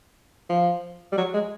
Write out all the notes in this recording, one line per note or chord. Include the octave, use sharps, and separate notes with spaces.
F3
G3
F#3
G#3